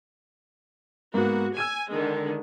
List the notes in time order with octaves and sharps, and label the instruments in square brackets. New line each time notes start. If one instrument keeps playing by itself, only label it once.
[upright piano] G#2 A#3 B3 [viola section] F#4
[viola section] G#5 [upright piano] E6 G#6 D#7
[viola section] D3 D#3 G#3